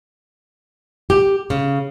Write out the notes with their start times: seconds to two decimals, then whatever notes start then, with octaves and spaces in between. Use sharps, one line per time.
1.10 G4
1.50 C#3